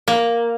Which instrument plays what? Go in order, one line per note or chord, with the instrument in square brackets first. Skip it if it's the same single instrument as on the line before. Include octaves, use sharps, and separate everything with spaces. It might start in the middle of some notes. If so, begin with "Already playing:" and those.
[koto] A#3